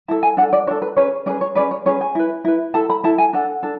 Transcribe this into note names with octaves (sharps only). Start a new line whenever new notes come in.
E4 A4 A5
G#5
D4 A4 F#5
D5
D4 A4 C#5
B4
C#4 G#4 B4 C#5
C#4 G#4 B4 D5
C#5
C#4 G#4 B4 D5
C#5
C#4 G#4 B4 C#5
G#5
E4 B4
E4 B4
E4 A4 A5
B5
E4 A4 A5
G#5
D4 A4 F#5
D4 A4